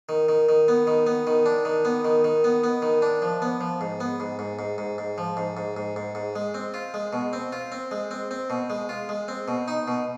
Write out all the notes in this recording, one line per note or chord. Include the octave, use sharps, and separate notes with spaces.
D#3
D#3
D#3
B3
D#3
B3
D#3
D4
D#3
B3
D#3
D#3
B3
B3
D#3
D4
F3
B3
F3
G#2
B3
G#2
G#2
G#2
G#2
G#2
F3
G#2
G#2
G#2
G#2
G#2
G#3
C4
F4
G#3
B2
C4
F4
C4
G#3
C4
C4
B2
G#3
F4
G#3
C4
B2
D#4
B2